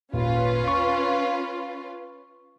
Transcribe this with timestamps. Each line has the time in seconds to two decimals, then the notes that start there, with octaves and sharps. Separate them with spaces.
0.14 G#1 D#2 A#2 C#4 F4 B4
0.68 C#6